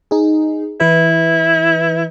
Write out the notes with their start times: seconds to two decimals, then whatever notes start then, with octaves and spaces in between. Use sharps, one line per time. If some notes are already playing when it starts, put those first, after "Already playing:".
0.11 D#4 G#4
0.80 E3 E4 B4